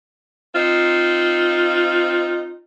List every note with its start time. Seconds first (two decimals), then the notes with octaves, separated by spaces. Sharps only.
0.53 C4 D#4 F4